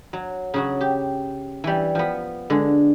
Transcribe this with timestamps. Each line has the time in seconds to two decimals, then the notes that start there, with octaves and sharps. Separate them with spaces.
0.13 F#3
0.54 C#3 F#3 F#4
0.81 G4
1.64 E3 G3
1.95 F3 B3
2.50 D3 G#3